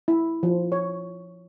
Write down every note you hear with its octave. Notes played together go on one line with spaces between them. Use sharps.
E4
F3
C#5